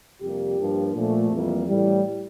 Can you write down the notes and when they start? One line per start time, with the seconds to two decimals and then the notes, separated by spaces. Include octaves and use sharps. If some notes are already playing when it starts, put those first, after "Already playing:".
0.21 F2 C3 G3 A#3 G4
0.58 G2 F3 A#3
0.95 A#2 F3 A3
1.32 F2 E3 G3 A#3
1.68 A2 E3 G3